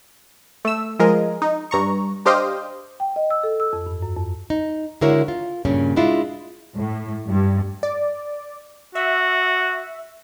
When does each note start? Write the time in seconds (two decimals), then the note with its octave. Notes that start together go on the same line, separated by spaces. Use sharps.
0.65 A3 E6
0.99 F3 G#3 A#4 D#5
1.42 D#4
1.71 G2 A#5 C#6
2.25 D4 G4 C5 D#5 F5 G5
3.00 G5
3.16 D#5
3.30 E6
3.43 A4
3.60 E6
3.73 F2
3.86 G2
4.03 F#2
4.16 F2
4.50 D#4
5.01 D3 G#3 E4 F#4 A#4 C#5
5.28 F4
5.65 G2 A#2 C#3 A#3 C#4
5.96 G#3 D4 E4 F4
6.76 A2
7.27 G2
7.83 D5
8.95 F#4 E5